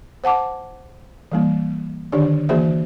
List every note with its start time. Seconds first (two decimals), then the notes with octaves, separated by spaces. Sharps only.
0.24 C5 F#5 A5 D6
1.32 E3 G3 A#3
2.12 D3 D#3 D4 G4 D5
2.49 E3 A#3 F#4 G#4 C5 E5